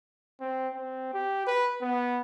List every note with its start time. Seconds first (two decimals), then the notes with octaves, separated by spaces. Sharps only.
0.40 C4
0.74 C4
1.14 G4
1.46 B4
1.82 B3